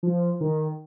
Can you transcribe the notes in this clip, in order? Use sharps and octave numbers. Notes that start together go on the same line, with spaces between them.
F3
D#3